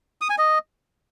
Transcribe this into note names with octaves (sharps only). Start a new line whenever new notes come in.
D#6
G#5
D#5